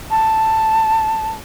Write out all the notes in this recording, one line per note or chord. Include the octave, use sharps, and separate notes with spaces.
A5